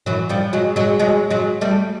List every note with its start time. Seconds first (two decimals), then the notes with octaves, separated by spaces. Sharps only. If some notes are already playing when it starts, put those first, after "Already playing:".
0.06 E3 F#3
0.29 F3 G3
0.53 F#3 G#3
0.76 F#3 G#3
0.99 F#3 G#3
1.30 F#3 G#3
1.61 G3 A3